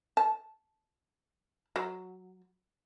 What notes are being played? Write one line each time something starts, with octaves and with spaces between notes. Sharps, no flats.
A5
F#3